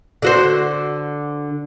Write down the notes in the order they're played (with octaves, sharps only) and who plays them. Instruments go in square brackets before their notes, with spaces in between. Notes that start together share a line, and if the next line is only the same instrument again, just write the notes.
[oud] D3 F#4 C5